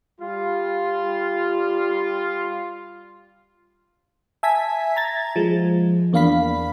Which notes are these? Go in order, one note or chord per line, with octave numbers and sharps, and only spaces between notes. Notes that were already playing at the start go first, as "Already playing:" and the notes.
G3 F4
E5 G#5 A5 G#6 B6
A#5 G#6 A6
F3 G#3
E2 A#3 D4 F5 B5 B6